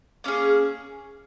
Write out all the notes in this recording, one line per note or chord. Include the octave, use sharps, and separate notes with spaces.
A#3 C#4 G#4